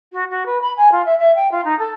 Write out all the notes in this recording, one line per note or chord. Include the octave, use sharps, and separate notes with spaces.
F#4
F#4
B4
B5
G#5
F4
E5
E5
G5
F4
D#4
A4